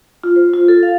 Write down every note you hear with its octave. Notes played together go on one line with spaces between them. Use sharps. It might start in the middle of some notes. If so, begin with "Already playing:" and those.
F4
C5
F4
A4
F5